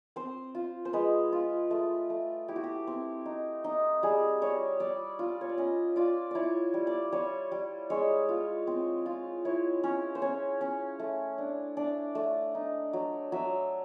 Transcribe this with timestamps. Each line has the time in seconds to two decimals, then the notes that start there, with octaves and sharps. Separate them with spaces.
0.16 C4 C5
0.55 F4
0.85 C5
0.93 G#3 B4
1.32 F4
1.71 A3
2.10 A3
2.48 E4 G4
2.56 F#4
2.64 G4
2.87 C4
3.26 D#4
3.64 D#4
4.03 G3 G#4
4.42 G3 C#5
4.80 G3 D5
5.19 F4
5.41 C#5
5.49 D5
5.58 C#4 D#5
5.96 F4 D5
6.31 E4 C#5 D5
6.74 G3
6.87 D5
7.12 G3 C#5
7.52 G3
7.90 G#3 C#5
8.29 F4
8.67 C4
9.06 F4
9.45 E4 C#5
9.83 C#4 C#5
10.15 C5
10.22 C#4 C#5
10.61 C#4
10.99 A3
11.38 D4
11.77 D4 D5
12.15 A3
12.55 D#4
12.93 F#3
13.32 F#3 E5